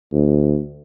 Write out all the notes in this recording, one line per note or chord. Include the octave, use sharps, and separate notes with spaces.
D2